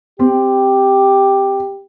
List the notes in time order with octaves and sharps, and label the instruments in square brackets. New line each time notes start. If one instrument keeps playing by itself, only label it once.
[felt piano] C4 [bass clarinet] G4